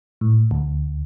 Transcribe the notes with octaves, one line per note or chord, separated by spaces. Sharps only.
A2
D2